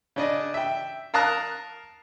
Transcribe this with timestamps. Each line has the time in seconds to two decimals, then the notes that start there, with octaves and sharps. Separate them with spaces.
0.16 C#3 D4 D#5
0.54 E5 G5
1.14 A#4 F5 A5 A#5 D#6 F#6